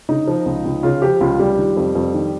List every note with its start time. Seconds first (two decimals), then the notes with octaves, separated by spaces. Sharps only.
0.09 C#3 D#4
0.27 F3
0.46 C#2
0.65 C#2
0.83 C#3 F4
1.02 F3 G4
1.21 C#2 F4
1.39 C#2 G3
1.58 D#3
1.77 F2
1.95 F2
2.14 D#3